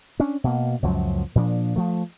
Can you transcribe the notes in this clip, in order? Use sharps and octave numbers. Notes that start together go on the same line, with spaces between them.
C#4 D4
B2 A#3
C#2 F#2 F3 F#3
A#2 F3 C#4 D4
F3 A3